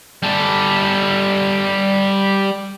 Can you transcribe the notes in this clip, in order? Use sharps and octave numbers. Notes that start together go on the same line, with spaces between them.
G3 A4